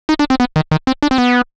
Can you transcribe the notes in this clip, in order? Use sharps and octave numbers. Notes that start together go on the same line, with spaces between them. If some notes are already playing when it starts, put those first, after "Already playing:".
D#4
D4
C4
B3
D#3
D#3
C4
D4
C4
B3